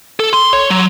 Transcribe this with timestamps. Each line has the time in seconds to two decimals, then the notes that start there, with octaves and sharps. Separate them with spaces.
0.20 A4
0.33 C6
0.53 C#5
0.70 F#3